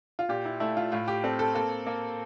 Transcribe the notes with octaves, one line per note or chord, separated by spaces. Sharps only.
F4
A#2 G4
E4
A3 E4
F4
A2 F4
G4
C4 A4
A4
A#3 A4
A#3